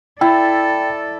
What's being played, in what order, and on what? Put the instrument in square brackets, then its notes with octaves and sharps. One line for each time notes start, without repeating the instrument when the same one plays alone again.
[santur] E4 [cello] A4 D5 [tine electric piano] G5